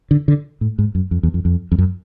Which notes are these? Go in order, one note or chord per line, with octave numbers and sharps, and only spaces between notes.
D3
D3
A2
G#2
F#2
F2
E2
F2
F2
F2
F#2